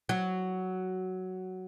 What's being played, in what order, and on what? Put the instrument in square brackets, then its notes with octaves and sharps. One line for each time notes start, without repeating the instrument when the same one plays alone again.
[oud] F#3